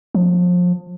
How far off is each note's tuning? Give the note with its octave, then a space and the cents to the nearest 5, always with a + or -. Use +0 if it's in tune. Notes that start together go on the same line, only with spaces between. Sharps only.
F3 +30